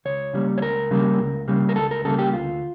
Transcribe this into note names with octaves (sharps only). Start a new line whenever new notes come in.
C#2 C#5
C#3 G3 A#3
C#5
C#2 A#4
C#3 G3 A#3
C#2
C#3 G3 A#3
A#4
C#2 A4
A#4
C#3 G3 A#3 A4
G4
D2 F4